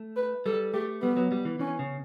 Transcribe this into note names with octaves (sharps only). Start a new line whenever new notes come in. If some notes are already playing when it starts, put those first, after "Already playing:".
Already playing: A3
B4
G3 A4
A3 G4
G3 B3
F#3
G3
E3
E3 C#4
C#3